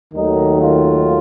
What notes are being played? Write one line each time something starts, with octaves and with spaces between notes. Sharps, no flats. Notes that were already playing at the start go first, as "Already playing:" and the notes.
D#2 D#3 F#3 A3 D#4
F4